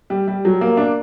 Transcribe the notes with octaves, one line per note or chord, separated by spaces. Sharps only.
G3
G3
F#3
A#3
D4